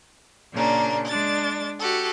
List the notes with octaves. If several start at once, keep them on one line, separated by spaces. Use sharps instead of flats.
A#2 C#3 A#3 D4
G#3 D4 D5 A6
F#4 G4 A4